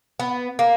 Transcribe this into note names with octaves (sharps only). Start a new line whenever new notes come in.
B3
A#3